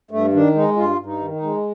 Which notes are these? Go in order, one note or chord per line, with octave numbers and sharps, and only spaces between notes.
G2 A3
D#3 D4
G#3 D#4
G2 F4
G2
D#4
D#3
D#4
G#3